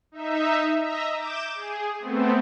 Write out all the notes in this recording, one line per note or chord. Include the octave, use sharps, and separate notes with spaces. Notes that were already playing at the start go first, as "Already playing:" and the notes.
D#4 E5
D#5 E5 A#5
D6 G6 E7
G#4
A3 B3 C4